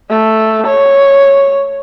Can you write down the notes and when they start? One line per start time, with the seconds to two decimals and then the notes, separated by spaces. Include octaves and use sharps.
0.10 A3
0.68 C#5